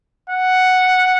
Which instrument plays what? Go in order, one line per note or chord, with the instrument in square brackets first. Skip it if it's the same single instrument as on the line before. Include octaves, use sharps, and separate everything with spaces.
[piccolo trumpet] F#5